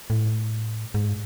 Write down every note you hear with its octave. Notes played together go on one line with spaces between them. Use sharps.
A2
G#2